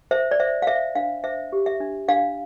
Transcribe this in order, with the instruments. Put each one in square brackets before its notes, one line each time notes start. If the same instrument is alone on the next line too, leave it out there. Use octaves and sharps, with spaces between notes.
[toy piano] C5 E5
D5
C5 E5
F5
C5 E5
D4 F5
C5 E5
G4
E5
D4
D4 F5